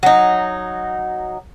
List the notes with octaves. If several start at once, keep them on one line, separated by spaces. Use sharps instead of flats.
F#3 D#4